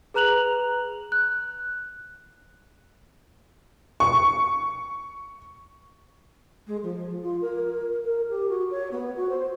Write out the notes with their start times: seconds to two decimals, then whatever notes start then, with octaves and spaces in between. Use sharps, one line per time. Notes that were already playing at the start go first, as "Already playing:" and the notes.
0.14 G#4 B4 A#5 F#6 F7 F#7
1.12 F#6
4.00 C#6
6.67 G#3
6.83 F3
7.22 F4
7.41 A#4
8.04 A#4
8.30 G4
8.49 F#4
8.71 C#5
8.91 B3
9.16 F#4
9.29 C5